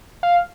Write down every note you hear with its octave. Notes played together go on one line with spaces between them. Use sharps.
F5